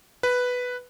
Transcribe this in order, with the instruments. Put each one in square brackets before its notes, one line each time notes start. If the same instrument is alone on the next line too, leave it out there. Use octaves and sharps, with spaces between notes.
[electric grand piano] B4